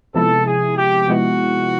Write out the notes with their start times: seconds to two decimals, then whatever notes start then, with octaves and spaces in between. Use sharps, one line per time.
0.14 C3 F3 G#3 B3 E4 A4
0.46 G#4
0.77 G4
1.08 C3 F3 G#3 B3 E4 F#4